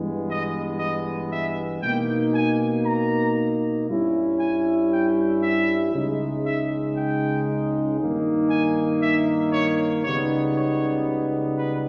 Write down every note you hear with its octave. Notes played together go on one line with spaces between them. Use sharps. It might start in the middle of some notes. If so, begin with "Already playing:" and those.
Already playing: G2 E3 G#3 B3
D#5
D#5
E5
B2 A#3 D#4 G5
G#5
A#5
G2 G3 C#4 E4
G#5
G5
E5
C#2 C#3 G#3 D#4
E5
G5
G2 D#3 A#3 D#4
G#5
E5
C#5
C#2 C#3 G3 B3 D#4 C#5
C#5
B4